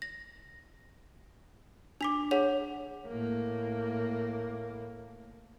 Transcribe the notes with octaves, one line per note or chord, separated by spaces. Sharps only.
A#6
D4 D6 B6 F7
G#4 C#5 F#5 F7
A2 A#3